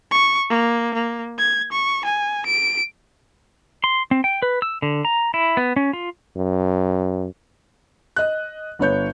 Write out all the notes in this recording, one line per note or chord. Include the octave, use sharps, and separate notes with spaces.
C#6
A#3
A#3
G#6
C#6
G#5
D7
C6
C4
G5
B4
E6
D3
A#5
E4
B3
C#4
F4
F#2
D#5 F#6
G1 B3 C#5 G6